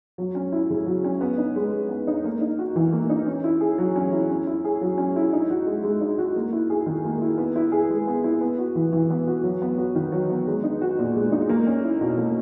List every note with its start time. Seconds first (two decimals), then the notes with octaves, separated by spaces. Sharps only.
0.18 F#3
0.35 C#4
0.52 E4
0.70 C#3
0.86 F#3
1.04 C#4
1.21 B3
1.38 D#4
1.56 G#3
1.72 G#3
1.89 B3
2.07 D#4
2.24 A#3
2.41 D#4
2.59 F#4
2.76 E3
2.92 A#3
3.10 D#4
3.26 C#4
3.44 E4
3.61 G#4
3.78 F#3
3.96 C#4
4.12 E4
4.30 C#4
4.47 E4
4.65 G#4
4.81 F#3
4.98 C#4
5.16 E4
5.33 D#4
5.50 F#4
5.66 G#3
5.83 G#3
6.01 D#4
6.18 F#4
6.36 A#3
6.53 E4
6.70 G#4
6.86 D#3
7.05 A#3
7.22 E4
7.38 B3
7.56 E4
7.72 G#4
7.90 G#3
8.07 B3
8.24 E4
8.41 B3
8.58 F#4
8.76 E3
8.92 E3
9.10 B3
9.27 F#4
9.44 F#3
9.62 B3
9.78 F#4
9.95 D#3
10.12 F#3
10.30 B3
10.47 G#3
10.64 D#4
10.81 F#4
10.99 A#2
11.16 G#3
11.32 D#4
11.49 A#3
11.66 C#4
11.84 E4
12.01 B2
12.18 A#3